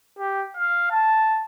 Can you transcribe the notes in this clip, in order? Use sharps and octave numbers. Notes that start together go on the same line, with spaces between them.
G4
F5
A5